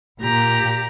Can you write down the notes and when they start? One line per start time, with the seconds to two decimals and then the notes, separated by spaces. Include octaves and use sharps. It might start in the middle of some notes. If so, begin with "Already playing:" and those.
0.21 A#2 G4 A#5